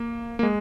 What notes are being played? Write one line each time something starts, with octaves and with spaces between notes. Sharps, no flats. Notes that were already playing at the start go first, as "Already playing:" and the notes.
Already playing: A#3
A#3
G#3